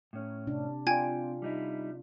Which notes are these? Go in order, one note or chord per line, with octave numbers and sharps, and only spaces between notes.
A2 C#4
C3 D4
C4 F4 D5 G5 G#5 G#6
G3 D#4 E4